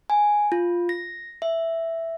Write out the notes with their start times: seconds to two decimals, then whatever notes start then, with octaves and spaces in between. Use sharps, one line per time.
0.10 G#5
0.52 F4
0.89 A#6
1.42 E5